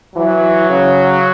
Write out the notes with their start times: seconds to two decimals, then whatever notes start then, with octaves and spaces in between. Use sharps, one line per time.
0.16 E3 F#3
0.69 C#3